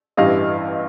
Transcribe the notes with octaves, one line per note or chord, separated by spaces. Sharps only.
A1 G2 E3 G3 D#5 F5